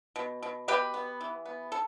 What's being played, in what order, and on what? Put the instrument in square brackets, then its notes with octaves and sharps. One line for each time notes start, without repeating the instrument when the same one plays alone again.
[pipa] B2
B2
B2 G4 B4
B3
E3
B3
A4